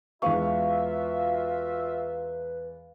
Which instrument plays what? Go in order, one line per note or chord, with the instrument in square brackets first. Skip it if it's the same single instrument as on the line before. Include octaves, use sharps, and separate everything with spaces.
[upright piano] E2 G#3 C#6 [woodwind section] F4 F#4 E5 [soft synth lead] B4 [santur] F5